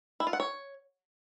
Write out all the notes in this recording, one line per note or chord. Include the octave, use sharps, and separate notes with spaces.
E4
F4
F#5
C#5